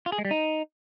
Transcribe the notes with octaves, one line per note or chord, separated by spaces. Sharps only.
F4
G#4
G#3
G3
D#4